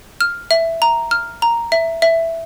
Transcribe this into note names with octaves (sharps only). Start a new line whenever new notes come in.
F6
E5
A#5
F6
A#5
E5
E5